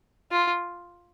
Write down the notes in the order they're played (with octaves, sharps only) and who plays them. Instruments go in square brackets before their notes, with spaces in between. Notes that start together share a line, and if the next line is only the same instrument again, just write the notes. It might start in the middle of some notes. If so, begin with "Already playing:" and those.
[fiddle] F4